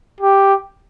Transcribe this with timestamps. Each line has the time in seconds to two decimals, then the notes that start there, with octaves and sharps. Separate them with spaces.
0.21 G4